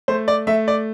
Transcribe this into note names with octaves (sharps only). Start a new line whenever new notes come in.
A3 C5
D5
A3 E5
D5